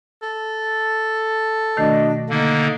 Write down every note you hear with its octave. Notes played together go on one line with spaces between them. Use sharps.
A4
B2 D#3 A3 D4 F#4 D#5
D3 A#3 D#4